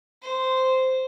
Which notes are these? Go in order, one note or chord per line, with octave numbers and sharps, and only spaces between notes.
C5